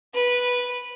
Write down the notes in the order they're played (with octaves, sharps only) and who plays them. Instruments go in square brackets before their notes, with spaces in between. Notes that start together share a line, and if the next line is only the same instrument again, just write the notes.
[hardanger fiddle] B4